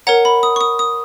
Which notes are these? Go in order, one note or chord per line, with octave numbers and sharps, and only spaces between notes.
A#4 C#5 F#5 A#5
B5
D#6
C#6
D#6
D#6